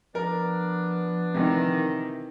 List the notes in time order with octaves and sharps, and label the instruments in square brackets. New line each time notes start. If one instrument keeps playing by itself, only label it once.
[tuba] F3 [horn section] B3 D4 [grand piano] A#4
[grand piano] C3 E3 [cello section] D#3